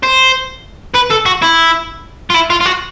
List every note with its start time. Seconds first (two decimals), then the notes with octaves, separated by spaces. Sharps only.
0.03 C5
0.95 B4
1.11 A4
1.26 F#4
1.42 E4
2.30 F4
2.34 E4
2.50 F4
2.61 F4
2.65 F#4